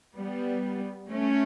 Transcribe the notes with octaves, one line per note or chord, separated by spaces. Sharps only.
G3 B3
A3 C#4